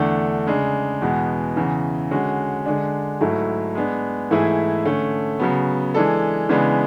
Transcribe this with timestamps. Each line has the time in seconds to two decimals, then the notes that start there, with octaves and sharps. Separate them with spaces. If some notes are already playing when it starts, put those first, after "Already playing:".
Already playing: E2 D3 A3 D4
0.47 C#3 G#3 D4
1.02 E2 B2 G#3 B3
1.56 E2 C#3 E3
2.11 D3 G#3 C#4 F#4
2.66 D3 G#3 D4
3.21 G#2 F#3 A3 E4 A4
3.75 G#3 B3 D4
4.31 G#2 E3 A3 E4 G#4
4.85 D3 A3 C#4
5.40 C#3 F#3 B3
5.94 E3 G#3 D4 A4
6.49 C#3 E3 G#3 B3 D4